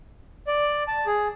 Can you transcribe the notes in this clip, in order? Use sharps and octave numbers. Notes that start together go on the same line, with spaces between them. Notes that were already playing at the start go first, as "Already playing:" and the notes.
D5
A5
G#4